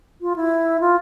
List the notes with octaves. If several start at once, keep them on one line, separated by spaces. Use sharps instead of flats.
F4
E4
F4